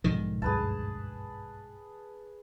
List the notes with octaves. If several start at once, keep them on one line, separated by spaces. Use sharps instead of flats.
B1 G#2 B2 D3 D#3 F3
D2 G2 G#4 B4 A5